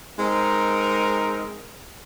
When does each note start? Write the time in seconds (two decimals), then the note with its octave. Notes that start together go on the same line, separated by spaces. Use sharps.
0.18 G#3 C4 D#4 A#4